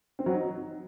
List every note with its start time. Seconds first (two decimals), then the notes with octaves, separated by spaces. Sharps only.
0.19 C4
0.26 F#3
0.34 D#4